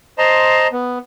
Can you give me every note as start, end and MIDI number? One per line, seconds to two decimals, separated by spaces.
0.18 0.67 72
0.18 0.67 75
0.18 0.67 81
0.18 0.67 82
0.18 0.67 84
0.72 0.98 59